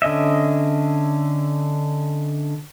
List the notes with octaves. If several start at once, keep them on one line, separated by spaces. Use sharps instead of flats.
D3 C#4 D#5 E5